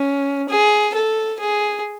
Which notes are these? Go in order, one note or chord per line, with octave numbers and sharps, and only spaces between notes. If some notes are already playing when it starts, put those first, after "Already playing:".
Already playing: C#4
G#4
A4
G#4